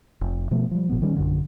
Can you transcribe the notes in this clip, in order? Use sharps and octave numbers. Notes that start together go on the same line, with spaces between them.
F1
B2 F3 A3 B3
F3 G3
G1 A#2 F3 B3
D#3 G3 C#4
A#1 F#2 D3